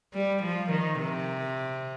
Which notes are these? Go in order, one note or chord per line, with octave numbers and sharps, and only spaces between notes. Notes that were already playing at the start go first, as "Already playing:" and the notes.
G3
F3
D#3
C3